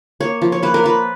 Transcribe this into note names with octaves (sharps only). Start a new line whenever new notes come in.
A#3 C#5
F3
C#5
A#3 B4
A#4
F3 B4